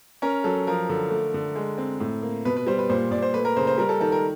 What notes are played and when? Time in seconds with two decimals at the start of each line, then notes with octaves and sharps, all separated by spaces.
0.22 C#4 A#4
0.44 F#3 A4
0.67 F3 A#4
0.89 D3
1.11 A3
1.34 D3
1.56 G#3
1.78 C4
2.00 A2
2.23 A#3
2.45 B2 B4
2.57 B4
2.66 G3 C5
2.79 B4
2.89 A#2 C5
3.11 A#2 D5
3.22 C5
3.34 A3 B4
3.45 A#4
3.57 C#3 C5
3.67 C5
3.78 G3 A#4
3.89 A4
4.01 D#3 A4
4.12 A#4